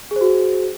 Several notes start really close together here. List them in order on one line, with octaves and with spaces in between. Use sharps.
G#4 C5 F#4